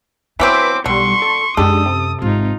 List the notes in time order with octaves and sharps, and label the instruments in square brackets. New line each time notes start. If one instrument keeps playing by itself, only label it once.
[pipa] E3 F#3 C4 [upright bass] B3 [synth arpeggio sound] B4 B6 [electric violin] C5 D6
[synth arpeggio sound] B1 G3 [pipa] D3 [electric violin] C6 C#6
[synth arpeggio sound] A4
[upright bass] F#2 D#4 [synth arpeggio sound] G#3 D4 G4 [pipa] A4 [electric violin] D#6
[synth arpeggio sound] C3
[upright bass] G#1 [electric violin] D#4 F4